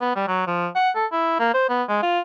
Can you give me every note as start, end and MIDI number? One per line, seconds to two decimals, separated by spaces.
0.01 0.12 59
0.16 0.25 55
0.28 0.43 54
0.47 0.67 53
0.75 0.90 78
0.95 1.06 69
1.12 1.39 64
1.39 1.50 58
1.54 1.68 72
1.69 1.83 59
1.89 1.98 56
2.03 2.20 65